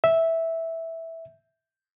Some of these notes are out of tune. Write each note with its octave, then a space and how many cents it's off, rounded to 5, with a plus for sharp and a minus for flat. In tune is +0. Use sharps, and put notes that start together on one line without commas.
E5 -10